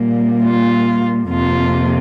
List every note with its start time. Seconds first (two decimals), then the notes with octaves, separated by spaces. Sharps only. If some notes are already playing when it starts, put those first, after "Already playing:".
Already playing: A#2 G3 A#3
0.42 F4
1.28 F2 C3 A#3 F4